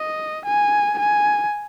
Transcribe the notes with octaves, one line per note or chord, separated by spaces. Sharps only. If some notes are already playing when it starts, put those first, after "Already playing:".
Already playing: D#5
G#5
G#5